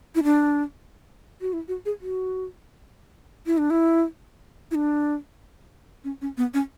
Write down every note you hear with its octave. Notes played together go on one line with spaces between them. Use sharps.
E4
D4
F#4
E4
F#4
G#4
F#4
E4
D4
E4
E4
D4
C#4
C#4
B3
C#4